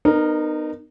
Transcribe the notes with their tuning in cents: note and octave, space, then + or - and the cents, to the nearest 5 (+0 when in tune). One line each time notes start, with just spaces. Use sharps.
B3 +20 D#4 -30 A#4 +0